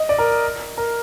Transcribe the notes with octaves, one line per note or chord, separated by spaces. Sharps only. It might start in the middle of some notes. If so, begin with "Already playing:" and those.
Already playing: D#5
D5
A#4
A#4